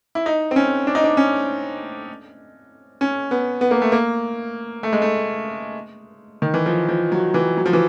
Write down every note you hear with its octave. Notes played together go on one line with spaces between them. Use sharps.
E4
D#4
C4
C#4
D4
D#4
D4
C#4
C#4
B3
B3
A#3
A3
A#3
A3
G#3
A3
D#3
E3
F3
F3
F#3
E3
F#3
F3
E3